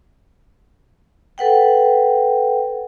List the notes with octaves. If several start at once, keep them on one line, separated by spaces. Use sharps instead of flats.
A4 B4 F#5 G5